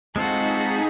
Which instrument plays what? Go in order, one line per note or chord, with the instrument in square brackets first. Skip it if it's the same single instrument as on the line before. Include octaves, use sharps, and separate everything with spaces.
[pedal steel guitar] G#3 C4 F4 [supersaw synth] D#4 G#4 B6 [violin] F#4 A4